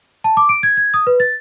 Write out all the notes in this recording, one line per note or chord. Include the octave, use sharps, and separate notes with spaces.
A5
D6
D7
G#6
G#6
D#6
B4
A6